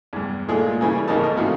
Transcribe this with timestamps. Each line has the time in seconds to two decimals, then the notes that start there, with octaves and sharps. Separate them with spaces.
0.13 E2 G2
0.49 A#2 G#3 A3 F4 G#4
0.80 A#2 C#3 E3 G3
1.08 G#1 F2 C#3 A#3 D#4 A5
1.24 D#5
1.37 A2 C3 F3 F4 F#4